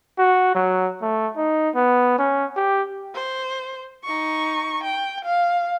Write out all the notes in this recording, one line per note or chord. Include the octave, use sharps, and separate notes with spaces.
F#4
F#3
A3
D#4
B3
C#4
G4
C5
D#4 C#6
G5
F5